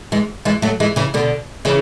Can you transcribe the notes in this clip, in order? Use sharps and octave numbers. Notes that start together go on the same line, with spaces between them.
E3 G#3
E3 G#3
F#3 A3
E3 G#3
C#3 E3
B2 D3
C#3 E3